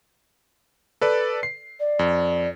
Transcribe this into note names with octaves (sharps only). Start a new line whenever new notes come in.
A4 B4 D5
C7
D5
F2